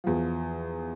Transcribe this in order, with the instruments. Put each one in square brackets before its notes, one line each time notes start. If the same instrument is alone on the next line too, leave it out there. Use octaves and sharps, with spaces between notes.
[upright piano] E2 F3